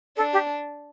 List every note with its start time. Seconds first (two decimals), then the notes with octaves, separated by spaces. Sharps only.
0.17 D4 A4
0.33 G4